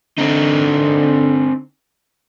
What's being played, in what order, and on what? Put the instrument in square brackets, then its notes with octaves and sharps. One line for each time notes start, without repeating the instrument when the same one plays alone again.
[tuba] D3 [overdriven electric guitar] C4 D#4